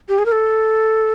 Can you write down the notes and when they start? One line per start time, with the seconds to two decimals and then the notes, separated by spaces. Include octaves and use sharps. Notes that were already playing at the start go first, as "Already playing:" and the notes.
0.09 G4
0.19 G#4
0.26 A#4
0.32 A4